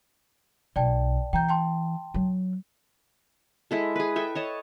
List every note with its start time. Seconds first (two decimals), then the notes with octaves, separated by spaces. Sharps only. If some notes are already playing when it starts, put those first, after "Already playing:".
0.76 B1 D5 G5 A5
1.33 E3 G5 A#5 G6
1.49 G5 A5 C6
2.14 F#3
3.71 G#3 E4 A4
3.96 G#4 B4
4.16 A4 E5 G5
4.35 C#5 D#5 A5